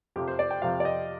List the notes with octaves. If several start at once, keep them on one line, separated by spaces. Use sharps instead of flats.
F2 C3 F3 G4
C5
D5
G5
F2 C3 F3 F5
D5
D#5